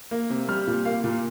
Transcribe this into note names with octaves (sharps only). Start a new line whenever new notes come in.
A#3
C3
G3 F6
A#2
A#3 F5
A#2